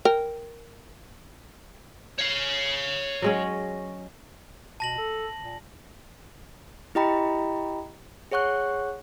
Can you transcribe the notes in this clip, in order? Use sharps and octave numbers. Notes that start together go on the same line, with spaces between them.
A#4 G5
C#5 F5
F#3 G#3 C#4
B2 A5 A#6 F#7
A4
A#2
E4 G4 D#5 G5 A#5 B5
G#4 C#5 F#5 C#6 F#6